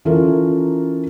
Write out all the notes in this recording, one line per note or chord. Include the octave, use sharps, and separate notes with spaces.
E3 C#4 F4 A4 A#4